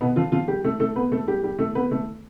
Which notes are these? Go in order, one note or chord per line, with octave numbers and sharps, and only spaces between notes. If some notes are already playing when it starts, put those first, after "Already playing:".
B2 B3
F3 F4
F3 F4
G3 G4
A3 A4
A3 A4
B3 B4
A3 A4
G3 G4
G3 G4
A3 A4
B3 B4
A3 A4